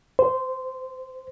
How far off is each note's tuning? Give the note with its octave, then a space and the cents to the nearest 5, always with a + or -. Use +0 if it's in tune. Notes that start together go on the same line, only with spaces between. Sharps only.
C5 -15